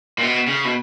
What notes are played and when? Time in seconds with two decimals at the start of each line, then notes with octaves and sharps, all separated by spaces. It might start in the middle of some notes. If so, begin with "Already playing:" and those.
0.18 A#2
0.22 B2
0.47 C#3
0.65 B2